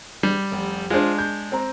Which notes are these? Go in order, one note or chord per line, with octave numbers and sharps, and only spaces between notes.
G3
F1
G#3 D4 F4 C5
G6
C4 A#5